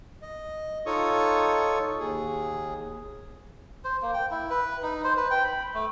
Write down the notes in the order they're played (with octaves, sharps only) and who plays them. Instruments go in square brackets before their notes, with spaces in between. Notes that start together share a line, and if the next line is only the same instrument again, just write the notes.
[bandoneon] D#5
D#4 F4 A4 C#5 C#6 D#6
D#2 G#4
[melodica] C5
A#3
G5
E4
B4
D#4
C5
B4
G5
B5
A3